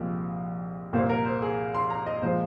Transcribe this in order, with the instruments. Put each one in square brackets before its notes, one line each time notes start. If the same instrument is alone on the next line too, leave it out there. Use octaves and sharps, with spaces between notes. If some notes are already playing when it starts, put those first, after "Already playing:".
Already playing: [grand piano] C2 A#2 F3 G#3 C4
C2 A#2 A#3 C5
A#4
C5
G#4
C6
A#5
D#5
A#2 F3 G#3 C5